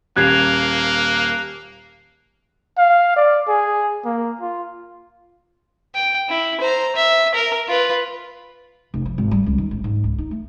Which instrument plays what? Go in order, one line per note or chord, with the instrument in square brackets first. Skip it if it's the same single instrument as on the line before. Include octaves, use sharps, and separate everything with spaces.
[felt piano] D#1 G#6 [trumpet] A#3 [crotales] F#6 C7 F7
[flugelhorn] F5
D5
G#4
A#3
F4
[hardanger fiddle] G5
E4
C5 A#5
E5
A#4
F4 B4
[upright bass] F1
F3
G#1
G3
C#2
D#3
A1
G#2
C#2
D#4
A3